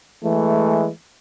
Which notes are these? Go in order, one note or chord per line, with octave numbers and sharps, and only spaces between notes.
E3 G#3 A3